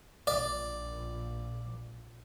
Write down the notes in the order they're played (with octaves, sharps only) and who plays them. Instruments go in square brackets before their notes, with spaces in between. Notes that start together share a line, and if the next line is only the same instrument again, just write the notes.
[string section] A#1 [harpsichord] D5